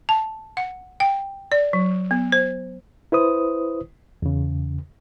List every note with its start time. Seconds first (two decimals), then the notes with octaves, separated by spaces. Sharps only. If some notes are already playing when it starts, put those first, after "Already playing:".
0.09 A5
0.57 F#5
1.00 G5
1.52 D5
1.73 F#3
2.11 B3
2.32 C5
3.12 E4 B4 C5 D#6
4.22 E2 C#3